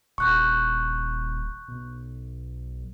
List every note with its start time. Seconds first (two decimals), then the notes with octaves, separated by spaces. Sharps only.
0.18 D#1 C#6 F#6 G6
1.68 B1